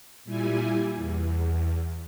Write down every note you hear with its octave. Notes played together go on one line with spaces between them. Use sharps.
A#2 G3 E4 G#5
E2